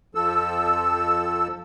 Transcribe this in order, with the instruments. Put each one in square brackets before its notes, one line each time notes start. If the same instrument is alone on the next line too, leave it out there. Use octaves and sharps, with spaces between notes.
[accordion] F2 F3 A4 E6